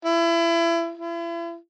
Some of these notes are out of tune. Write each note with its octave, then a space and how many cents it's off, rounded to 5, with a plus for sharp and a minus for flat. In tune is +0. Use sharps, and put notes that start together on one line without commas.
E4 +30
E4 +40